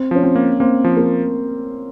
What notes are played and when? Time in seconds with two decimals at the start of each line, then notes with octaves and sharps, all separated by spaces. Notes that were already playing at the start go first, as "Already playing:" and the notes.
Already playing: C4
0.11 F3 C#4
0.23 C4
0.36 A#3
0.60 A#3 C4
0.84 F3
0.97 A#3